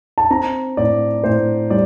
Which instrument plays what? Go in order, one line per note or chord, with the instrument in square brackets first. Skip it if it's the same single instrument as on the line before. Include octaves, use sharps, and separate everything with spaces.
[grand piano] A5
C4 A#5
A2 D5
A2 C5
G3 D5